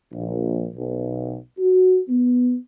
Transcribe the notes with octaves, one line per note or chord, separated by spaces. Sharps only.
A#1
B1
F#4
B3